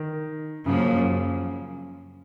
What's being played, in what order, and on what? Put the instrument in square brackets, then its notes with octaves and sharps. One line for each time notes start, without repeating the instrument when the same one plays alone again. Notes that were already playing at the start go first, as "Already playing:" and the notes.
Already playing: [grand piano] D#3
[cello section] F#2 F3 A#3 [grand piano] C#3